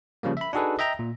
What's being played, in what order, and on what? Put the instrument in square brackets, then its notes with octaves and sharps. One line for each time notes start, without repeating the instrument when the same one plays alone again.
[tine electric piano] C#3 F3 G3 A#3
E5 B5
D4 D#4 F#4 G#4 A4 B4
D#5 E5 G5 A#5
A#2